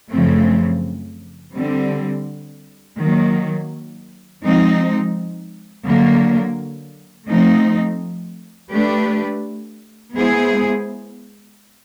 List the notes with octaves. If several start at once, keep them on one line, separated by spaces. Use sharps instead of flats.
F#2 C#3 F3 A3 C4
D3 G3 C4
D#3 F#3 A#3
F3 G#3 C4 D#4
D3 F#3 A#3
F3 A3 C4 D#4
A3 D4 G4 B4
G#3 B3 E4 G#4 C5